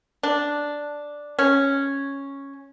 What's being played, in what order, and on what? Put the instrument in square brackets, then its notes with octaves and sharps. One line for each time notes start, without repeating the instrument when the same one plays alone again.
[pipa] D4
C#4